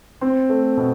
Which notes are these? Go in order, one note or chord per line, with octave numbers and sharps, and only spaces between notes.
C4
A3
B2